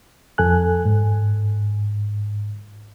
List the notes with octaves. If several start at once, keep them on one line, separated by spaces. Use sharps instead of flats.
F2 A4 G#5 F#6
G#2